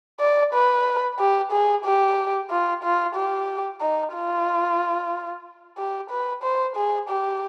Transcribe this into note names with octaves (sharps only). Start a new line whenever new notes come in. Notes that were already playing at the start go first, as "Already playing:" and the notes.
D5
B4
G4
G#4
G4
F4
F4
G4
D#4
F4
G4
B4
C5
G#4
G4